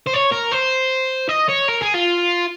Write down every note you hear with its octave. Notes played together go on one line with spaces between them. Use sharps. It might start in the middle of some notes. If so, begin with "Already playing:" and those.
C5
C#5
A#4
C5
D#5
C#5
A#4
G#4
F4